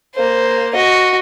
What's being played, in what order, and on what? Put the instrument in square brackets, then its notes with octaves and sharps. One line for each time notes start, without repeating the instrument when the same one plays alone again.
[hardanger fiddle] A#3 C5
F#4 D#5